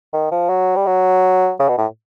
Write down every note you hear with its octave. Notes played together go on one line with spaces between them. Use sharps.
D#3
F3
F#3
G3
F#3
C#3
B2
A2